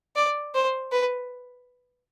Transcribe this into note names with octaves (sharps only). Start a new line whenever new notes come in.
D5
C5
B4